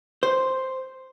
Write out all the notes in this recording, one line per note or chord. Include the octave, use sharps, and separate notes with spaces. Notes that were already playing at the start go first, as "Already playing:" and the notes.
C5